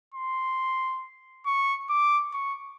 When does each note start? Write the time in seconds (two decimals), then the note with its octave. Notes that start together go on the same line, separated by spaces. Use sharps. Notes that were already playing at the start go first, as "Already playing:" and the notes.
0.14 C6
1.46 C#6
1.90 D6
2.33 C#6